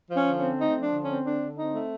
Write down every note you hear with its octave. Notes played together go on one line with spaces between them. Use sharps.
F3 C#4
D3
C4 C#4
A3 D#4
F3
D4
D3
C#4
C4
D3 D4
D3
C4 D#4
A3